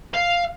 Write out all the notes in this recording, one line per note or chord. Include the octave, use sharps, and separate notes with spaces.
F5